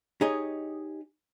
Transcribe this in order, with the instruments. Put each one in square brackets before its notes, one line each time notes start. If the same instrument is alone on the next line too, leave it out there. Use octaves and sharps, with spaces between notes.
[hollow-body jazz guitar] D#4 G4 G#4 C#5 D#5